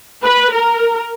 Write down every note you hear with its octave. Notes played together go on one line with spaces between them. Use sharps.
B4
A#4